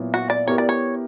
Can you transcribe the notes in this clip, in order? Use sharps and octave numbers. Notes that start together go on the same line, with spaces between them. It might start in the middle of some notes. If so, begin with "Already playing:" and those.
Already playing: A#2 F#3 B3 E4
F#4
D5
B3 E4 G4 A#4 C#5
D5
C#5